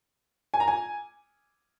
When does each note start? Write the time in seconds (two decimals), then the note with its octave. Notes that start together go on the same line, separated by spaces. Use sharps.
0.54 G#5
0.60 A#5
0.68 G#5